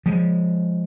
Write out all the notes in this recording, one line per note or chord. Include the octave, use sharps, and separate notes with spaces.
F3 G#3